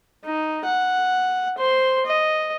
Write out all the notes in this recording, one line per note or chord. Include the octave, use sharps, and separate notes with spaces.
D#4
F#5
C5 C6
D#5